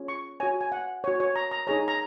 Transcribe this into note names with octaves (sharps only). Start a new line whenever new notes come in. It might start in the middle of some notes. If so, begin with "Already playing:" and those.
Already playing: C#4 F4 G#4 C#5
C#6
F#4 C#5 G#5
G#5
F#5
F#4 C#5
C#5
A#5
A#5
D#4 G#4 C#5 A#5
A#5